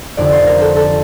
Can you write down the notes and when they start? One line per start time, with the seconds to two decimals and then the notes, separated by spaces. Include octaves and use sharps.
0.17 F1 F2 D3 D5
0.32 C5
0.47 A#4
0.61 A4
0.76 A4